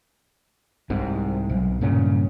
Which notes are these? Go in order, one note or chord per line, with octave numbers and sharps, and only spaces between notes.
C2 G#2 C3
B1
G2 A#2 C#3 C#4